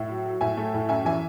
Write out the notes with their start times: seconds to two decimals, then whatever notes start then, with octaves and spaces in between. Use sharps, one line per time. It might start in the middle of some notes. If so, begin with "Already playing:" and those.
Already playing: A2 E5
0.09 F#3
0.25 F#3
0.41 A2 E5 G#5
0.57 A3
0.74 A2
0.89 F#2 E5 G#5
1.05 E3 E5 G#5